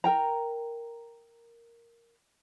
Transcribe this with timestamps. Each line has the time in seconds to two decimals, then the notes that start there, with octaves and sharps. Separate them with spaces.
0.04 A#4 G5 A#5